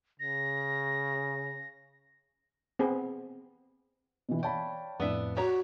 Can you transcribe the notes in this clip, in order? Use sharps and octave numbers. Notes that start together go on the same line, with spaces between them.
C#3 A#6
B3 C4 G#4
B2 E3
C#5 D5 F5 G5 A5 B5
F2 A2 B3 D4 E5
F#4 G4 C#5 A#5